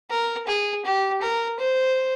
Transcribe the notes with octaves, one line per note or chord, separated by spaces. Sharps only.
A#4
G#4
G4
A#4
C5